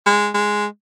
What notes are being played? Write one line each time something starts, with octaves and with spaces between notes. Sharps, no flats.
G#3
G#3